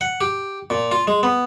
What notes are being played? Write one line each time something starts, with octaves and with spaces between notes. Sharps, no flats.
F#5
G4
A#2
F4
G#3
B3